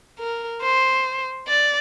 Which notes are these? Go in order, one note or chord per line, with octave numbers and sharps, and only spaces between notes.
A#4
C5
D5